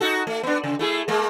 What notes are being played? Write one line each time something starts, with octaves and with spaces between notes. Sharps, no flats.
D#4 F#4 A4
A3
B3 D4
C#3
A3 E4 G#4
G#3 A#3